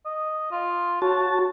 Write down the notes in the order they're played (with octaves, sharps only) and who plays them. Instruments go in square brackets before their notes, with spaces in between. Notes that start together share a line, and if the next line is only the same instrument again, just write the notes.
[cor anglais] D#5
F4
[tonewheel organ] F#4 A5 [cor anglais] C#5